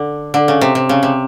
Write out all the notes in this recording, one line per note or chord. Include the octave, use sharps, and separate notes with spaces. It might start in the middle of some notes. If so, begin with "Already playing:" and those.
Already playing: D3
D3
C#3
C3
C3
C#3
C3